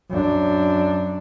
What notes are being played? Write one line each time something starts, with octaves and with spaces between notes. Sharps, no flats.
F#2 D4